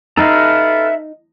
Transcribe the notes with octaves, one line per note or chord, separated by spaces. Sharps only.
D#4 A4 B4 E5 F5 A#5